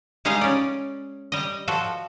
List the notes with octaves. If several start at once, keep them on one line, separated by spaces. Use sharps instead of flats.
G3 G#3 D#4 G#4 D#5 F5
C#4 D5
G3 D#5
F3 F#4 A4